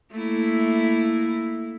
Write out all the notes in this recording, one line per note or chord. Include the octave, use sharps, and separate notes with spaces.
A3 A#3 E4